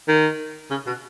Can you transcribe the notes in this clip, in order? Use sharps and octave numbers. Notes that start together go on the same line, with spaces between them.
D#3
C#3
B2